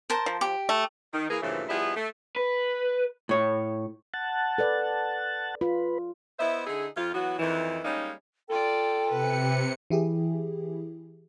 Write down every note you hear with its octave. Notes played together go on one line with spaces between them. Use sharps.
A#4 C5 A5
F3
G4
A3
D#3
E3 A#3 G#4
G2 A#2 C#3 E3 F3 A3
F3 G3 B3 E4 G#4 D#5
A3
B4
A2 C#5
F#5 A5
A4 B4 D5
F4 B4
B3 E4 C5 D#5 E5
D3 D#4 E4 G#4
F2 F4
E3 F#3 B3 F#4
F2 D#3 E3
G3 G#3 A#3 C#4 D#4
F4 A4 D5 G5
C3 B4 C#7
E3 E4 G4 G#4